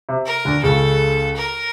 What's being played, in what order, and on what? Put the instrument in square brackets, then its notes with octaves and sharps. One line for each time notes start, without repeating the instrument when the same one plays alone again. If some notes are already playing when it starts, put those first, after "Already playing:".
[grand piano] C3
[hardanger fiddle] A#4
[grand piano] D2 D3
[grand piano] C#2 C#3 [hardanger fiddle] A4
[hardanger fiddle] A#4